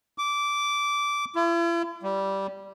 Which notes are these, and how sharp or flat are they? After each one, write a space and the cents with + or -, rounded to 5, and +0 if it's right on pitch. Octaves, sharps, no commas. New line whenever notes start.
D6 -15
E4 +45
G3 -10